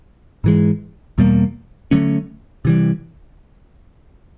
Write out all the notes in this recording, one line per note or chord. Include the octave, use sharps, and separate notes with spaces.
G#2 E3 G#3
E2 B2 G3 A#3
D3 F#3 A3 C#4
C3 E3 G3